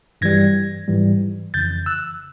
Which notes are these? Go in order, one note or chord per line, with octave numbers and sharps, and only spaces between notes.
G2 E3 G3 G#6 A#6
G#2 E3 G3
F2 C#3 E3 G6 A6
E6 F#6